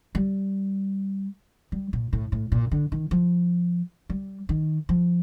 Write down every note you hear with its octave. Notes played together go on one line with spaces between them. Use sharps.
G3
G3
A#2
A2
A2
A#2
D3
D#3
F3
G3
D#3
F3